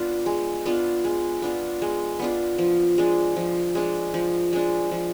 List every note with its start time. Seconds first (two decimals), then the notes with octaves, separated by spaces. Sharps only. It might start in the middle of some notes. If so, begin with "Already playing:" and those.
Already playing: B3 D4 F4
0.26 G#3
0.66 B3 D4 F4
1.04 G#3
1.42 B3 D4 F4
1.82 G#3
2.19 B3 D4 F4
2.58 F3
2.98 G#3 D4
3.36 F3
3.75 G#3 D4
4.14 F3
4.53 G#3 D4
4.91 F3